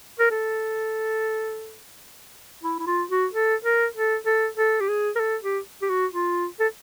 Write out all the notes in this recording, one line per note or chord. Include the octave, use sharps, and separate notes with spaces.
A#4
A4
E4
E4
F4
F#4
A4
A#4
A4
A4
A4
G4
G#4
A#4
A4
G4
G4
F#4
F4
A4